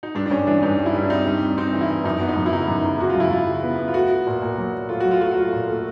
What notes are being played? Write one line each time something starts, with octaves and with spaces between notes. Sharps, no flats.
D#4
G2 D4
D4
G2 C#4
E3 D4
G2 D#4
G3
E4
G3
D4
C4 D#4
G3
C4
C4 D#4
E3
E4
E3
F#2 D#4
B3
D#4
F#2
E4
C#3 D#4
F#2
C#3
C#3 F#4
F4
F#2 E4
F#2 F4
C#3
B3
B3
F4
A3 F#4
A3
A#2
A#2
F#3
A#2
A3 F4
F#3 F#4
F4
A3 F#4
F4
A3
A#2
A3